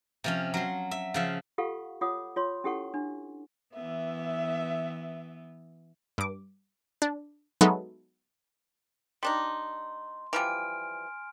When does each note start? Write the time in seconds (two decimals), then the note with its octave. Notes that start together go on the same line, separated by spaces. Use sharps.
0.24 C3 F3 C#4
0.54 F#3 C6
0.91 E5
1.14 C#3 F3 E5
1.58 F4 G4 A4 F5 F#5 C#6
2.01 F4 C#5 F#5 D6 D#6
2.36 F4 C#5 C6
2.64 C#4 E4 G4 A4 F#5 C#6
2.94 D4
3.74 E3 B3 E5
6.18 G2 D6
7.02 D4
7.61 F#3 G#3 B3 D#4 A4 E5
9.23 G3 D4 D#4 C6
10.33 E3 F3 G3 G#5 F6 D7